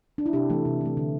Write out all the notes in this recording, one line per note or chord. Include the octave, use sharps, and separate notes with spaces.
D4
E4
C3 D4 G4
E3 A3
C3
E3 A3
D3